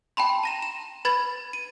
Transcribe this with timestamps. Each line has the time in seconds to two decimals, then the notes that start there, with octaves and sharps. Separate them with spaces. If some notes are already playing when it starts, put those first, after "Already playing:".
0.17 G5 A5 B5 C6
0.43 A#5 A#6 E7
0.62 E7
1.05 B4 B5 G#6 A6
1.53 D#7